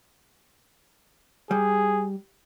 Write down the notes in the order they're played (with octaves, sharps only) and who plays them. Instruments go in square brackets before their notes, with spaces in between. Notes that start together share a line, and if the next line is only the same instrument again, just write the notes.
[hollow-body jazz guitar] G3 [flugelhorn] G#4